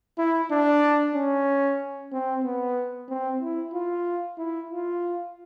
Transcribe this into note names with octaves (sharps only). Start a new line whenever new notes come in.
E4
D4
C#4
C4
B3
C4
E4
F4
E4
F4